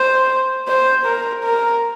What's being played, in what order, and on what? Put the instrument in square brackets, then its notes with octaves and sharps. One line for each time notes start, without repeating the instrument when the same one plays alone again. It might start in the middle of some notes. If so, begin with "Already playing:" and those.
Already playing: [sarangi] C5
C5
A#4
A#4